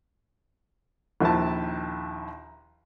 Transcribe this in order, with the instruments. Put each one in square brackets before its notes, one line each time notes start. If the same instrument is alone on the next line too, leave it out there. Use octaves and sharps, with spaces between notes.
[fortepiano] A#1 D#2 F3 E4 A5